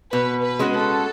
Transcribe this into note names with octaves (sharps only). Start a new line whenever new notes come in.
B2 B4
B4
G#3 C#4 F#4
A4